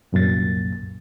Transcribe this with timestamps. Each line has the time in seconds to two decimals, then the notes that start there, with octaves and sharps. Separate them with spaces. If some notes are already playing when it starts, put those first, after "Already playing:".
0.12 C2 F#2 A#2 A6